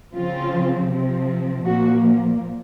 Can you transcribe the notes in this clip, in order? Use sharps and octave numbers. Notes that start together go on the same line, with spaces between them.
C#3 F3 C4 F4
C3 F3 C4
A#2 F3 A#3 F#4